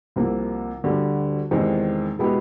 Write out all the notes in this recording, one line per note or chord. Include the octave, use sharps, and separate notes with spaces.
C2 C3 F3 A#3
D2 D3 G3
E2 C3 D#3 G#3 C4
B2 G#3 B3 E4 G4